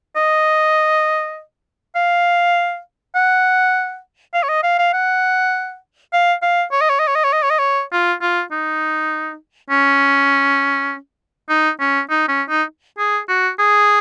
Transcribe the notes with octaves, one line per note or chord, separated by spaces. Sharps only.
D#5
F5
F#5
F5
C#5
D#5
F5
F5
F#5
F5
F5
C#5
D#5
C#5
D#5
C#5
D#5
C#5
D#5
C#5
D#5
C#5
F4
F4
D#4
C#4
D#4
C#4
D#4
C#4
D#4
G#4
F#4
G#4